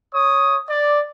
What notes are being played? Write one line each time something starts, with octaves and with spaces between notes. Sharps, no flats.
C#5 D#6
D5